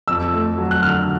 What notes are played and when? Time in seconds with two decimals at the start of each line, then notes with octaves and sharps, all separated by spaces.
0.08 F2 E6
0.34 A3
0.58 F#3
0.71 F#6
0.82 D3 F6